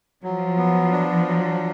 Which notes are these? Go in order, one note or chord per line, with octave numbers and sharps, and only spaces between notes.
F3 F#3
B3
D4
F#3